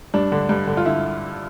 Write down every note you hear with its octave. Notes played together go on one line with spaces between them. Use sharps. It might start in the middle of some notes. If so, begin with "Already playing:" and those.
G2 D4
D3
G2
D3
F4
D3 E4